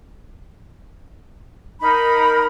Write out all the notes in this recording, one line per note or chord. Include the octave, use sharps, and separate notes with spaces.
D#4 A#4 B5